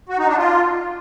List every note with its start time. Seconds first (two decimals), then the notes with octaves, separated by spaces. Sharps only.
0.09 F#4
0.18 D#4
0.28 D4
0.37 F4